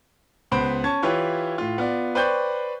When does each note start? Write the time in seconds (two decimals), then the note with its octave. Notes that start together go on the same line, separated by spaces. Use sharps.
0.52 C#2 B3 C5 B5 D7
0.84 C#4 A5 C#6 G#6
1.03 E3 E4 F4 G4 B4 C#5
1.58 A2 F4
1.78 B3 F4 D5
2.15 B4 C5 D5 G5 C#6 G6